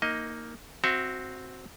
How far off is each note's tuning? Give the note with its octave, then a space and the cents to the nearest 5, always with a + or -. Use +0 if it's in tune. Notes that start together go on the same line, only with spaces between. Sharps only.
A#3 +0 D#4 +10 D#5 +15
C4 +0 F#4 +0 E5 +35